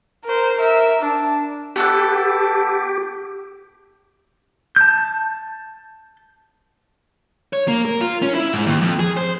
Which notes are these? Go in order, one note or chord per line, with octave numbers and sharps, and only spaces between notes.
A#4 C5
A#4 E5
D4
B3 G4 A4 F#6
A5 G6
C#5
A#3
A#4
F4
C#4
E4
G#2
D#2
F2
G#4
C5